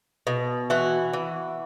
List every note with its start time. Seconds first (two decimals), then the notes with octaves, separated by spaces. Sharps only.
0.27 B2
0.70 E3 F#4
1.13 E3